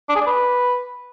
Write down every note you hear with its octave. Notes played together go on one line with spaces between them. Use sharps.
D4
G#4
D5
B4